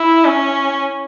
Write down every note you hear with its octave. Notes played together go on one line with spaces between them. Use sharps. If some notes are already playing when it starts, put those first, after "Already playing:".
Already playing: E4
C#4